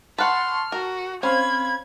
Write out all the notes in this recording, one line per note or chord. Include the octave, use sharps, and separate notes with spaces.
B4 F#5 A5 C6 C#6 F6
F#4 A#4
C4 C#4 C5 F5 B5 G#6